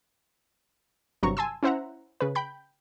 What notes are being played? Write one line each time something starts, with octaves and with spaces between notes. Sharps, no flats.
G1 G2 C3 F#3 A#5 C#6
G#5 A5 C6 E6
C#4 E4 C5 E5 F#5 A#5
C#3 B4
G5 B5 G6